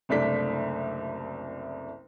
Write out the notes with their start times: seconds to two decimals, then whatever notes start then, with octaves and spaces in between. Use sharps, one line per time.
0.09 F#1 C2 A3 D4 B6